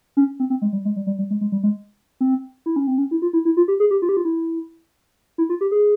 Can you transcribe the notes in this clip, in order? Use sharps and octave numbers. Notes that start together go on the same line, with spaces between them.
C#4
C4
C4
G#3
G3
G#3
G3
G3
G3
G#3
G#3
G3
G#3
C4
E4
C#4
C4
C#4
E4
F4
E4
E4
F4
G4
G#4
G4
F4
G4
F4
E4
E4
F4
G4
G#4